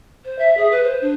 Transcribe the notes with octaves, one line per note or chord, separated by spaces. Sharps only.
C5
E5
G#4
B4
C5
D4